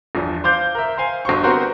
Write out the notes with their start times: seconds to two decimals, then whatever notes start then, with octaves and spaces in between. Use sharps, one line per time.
0.15 G1 E2 F3
0.44 C5 F5 D6 G6
0.75 A#4 E5
0.98 C5 F5 G#5
1.25 G1 F#4 C5 C#6
1.44 B3 C4 F#4 G4 A#4 C5